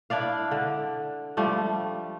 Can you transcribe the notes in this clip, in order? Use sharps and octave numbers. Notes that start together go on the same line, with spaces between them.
D4 E4 D5 F5
D3
F3 G3 A3